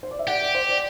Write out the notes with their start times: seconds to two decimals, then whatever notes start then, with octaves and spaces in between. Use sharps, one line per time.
0.03 C5
0.11 D5
0.19 E5
0.27 G4 D5 F#5
0.41 D5
0.55 C5
0.69 D5